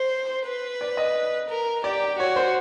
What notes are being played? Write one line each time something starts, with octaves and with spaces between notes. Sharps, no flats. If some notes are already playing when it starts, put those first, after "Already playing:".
Already playing: C5
B4
D5
D#5
A#4
G4 D5
F#4 C#5
C5